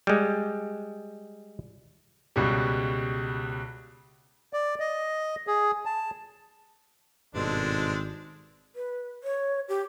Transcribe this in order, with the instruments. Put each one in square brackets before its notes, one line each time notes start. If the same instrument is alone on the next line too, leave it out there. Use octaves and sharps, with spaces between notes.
[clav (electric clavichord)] G3 G#3
[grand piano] C#2 B2 G3
[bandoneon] D5
D#5
G#4
A5
[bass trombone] G#1 [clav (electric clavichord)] G2 B2 A4 [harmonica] G#3 C4 D4
[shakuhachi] B4
C#5
G4